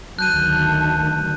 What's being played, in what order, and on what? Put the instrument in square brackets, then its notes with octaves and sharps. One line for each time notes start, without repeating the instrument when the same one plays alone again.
[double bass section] D2 D#3 [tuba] F#3 [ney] A5 [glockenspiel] F#6 G6 D#7